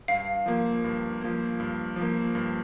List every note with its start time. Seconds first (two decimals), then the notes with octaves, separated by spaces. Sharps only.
0.08 G2 F5
0.46 F3 A#3
0.84 G2
1.21 F3 A#3
1.60 G2
1.96 F3 A#3
2.35 G2